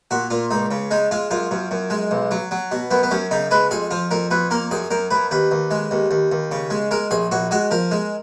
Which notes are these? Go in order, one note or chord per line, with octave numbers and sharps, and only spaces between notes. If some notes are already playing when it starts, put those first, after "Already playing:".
A#2 F#4
A#2 F4
C#2 D#4
C#3
G#3 D#4
G#3 F4
F#2 F4
F#2
F#2
G#3
B1
F#3
F#3
B2
F#2 B3
B3
F#2 C#4
C#3 D#4
G#3 B4
F2 G#4
F3 F4
F2 A#4
F2 B4
A#3 A#4
F#2 G#4
F#2 A#4
F#2 B4
D#2 B4
D#2
G#3
D#2
D#2
D#2
C#3
G#3
G#3 A#4
A#1 G#4
A#1 F#4
G#3 F#4
F3 A#4
G#3